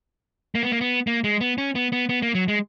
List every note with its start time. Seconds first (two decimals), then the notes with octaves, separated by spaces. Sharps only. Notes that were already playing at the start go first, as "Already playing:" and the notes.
0.55 A#3
0.63 B3
0.72 A#3
0.81 B3
1.07 A#3
1.24 G#3
1.41 B3
1.58 C#4
1.75 B3
1.92 B3
2.09 B3
2.22 A#3
2.35 F#3
2.48 G#3